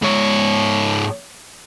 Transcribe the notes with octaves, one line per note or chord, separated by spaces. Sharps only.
G#2 C#5